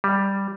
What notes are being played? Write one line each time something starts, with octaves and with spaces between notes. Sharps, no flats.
G3